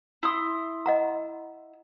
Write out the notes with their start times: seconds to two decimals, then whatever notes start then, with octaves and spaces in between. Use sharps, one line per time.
0.23 E4 C6 D#6
0.86 D#5 F#5 A#5